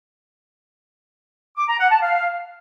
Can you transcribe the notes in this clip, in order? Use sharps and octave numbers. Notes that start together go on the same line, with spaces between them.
D6
A#5
F#5
A5
F5